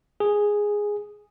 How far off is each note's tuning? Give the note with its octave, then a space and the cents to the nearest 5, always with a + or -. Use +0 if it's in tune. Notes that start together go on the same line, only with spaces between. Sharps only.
G#4 -5